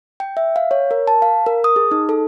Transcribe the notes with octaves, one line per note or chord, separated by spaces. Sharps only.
G5
E5
F5
C#5
A#4
A5
F5
A#4
D#6
G#4
D#4
A4